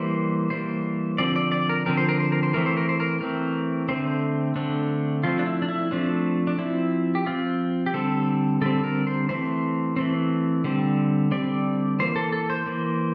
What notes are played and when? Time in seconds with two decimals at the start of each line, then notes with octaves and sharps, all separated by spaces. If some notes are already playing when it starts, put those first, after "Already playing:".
Already playing: E3 G3 A#3 C5
0.50 E3 G3 A#3 C5
1.18 D3 F3 C4 D5
1.36 D5
1.52 D5
1.69 A#4
1.86 D3 F3 C4 A#4
1.97 C5
2.09 A#4
2.20 C5
2.32 A#4
2.43 C5
2.53 E3 A3 C4 A#4
2.66 C5
2.77 A#4
2.89 C5
3.00 A#4
3.21 E3 A3 C4 A#4
3.89 D3 A3 C4 C5
4.56 D3 A3 C4 D4
5.23 F3 A3 C4 F4
5.39 D4
5.46 E4
5.62 D4
5.68 E4
5.91 F3 A3 C4 D4
6.47 D4
6.58 F3 C4 E4
7.15 G4
7.26 F3 C4 F4
7.86 G4
7.94 D3 G3 C4 A4
8.61 D3 G3 C4 A4
8.84 A#4
9.07 C5
9.29 E3 A3 C4 C5
9.96 E3 A3 C4
10.64 D3 G3 C4
11.31 D3 G3 C4 D5
11.99 E3 A#3 C5
12.16 A4
12.32 A4
12.50 C5
12.66 E3 A#3